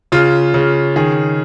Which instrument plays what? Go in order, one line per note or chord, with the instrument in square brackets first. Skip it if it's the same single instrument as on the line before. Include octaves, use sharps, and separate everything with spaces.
[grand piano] C#3 F4
C#3
D#3 G#4